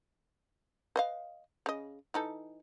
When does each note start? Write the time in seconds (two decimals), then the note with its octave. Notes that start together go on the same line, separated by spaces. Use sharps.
0.96 B4 D#5 F5
1.66 C#3 D#5
2.14 E3 D#4 A4